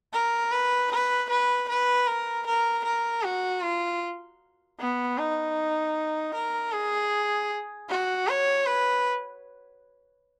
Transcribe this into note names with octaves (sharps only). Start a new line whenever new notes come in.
A#4
B4
B4
B4
B4
A#4
A#4
A#4
F#4
F4
B3
D#4
A#4
G#4
F#4
C#5
B4